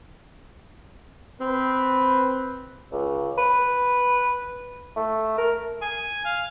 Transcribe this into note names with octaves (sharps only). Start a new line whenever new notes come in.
C4 B4
C#2
B4
A3
A#4
G#5
F5